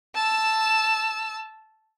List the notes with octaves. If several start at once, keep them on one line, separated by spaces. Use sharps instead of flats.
A5 E6